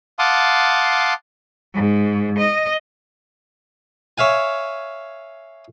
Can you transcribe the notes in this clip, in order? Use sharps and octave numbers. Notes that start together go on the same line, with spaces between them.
F5 F#5 A5 C6 D6 D#6
G#2
D#5
C#5 E5 F5 G#5